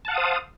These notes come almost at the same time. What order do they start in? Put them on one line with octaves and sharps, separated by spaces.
A5 F#5 F5 D#6 C5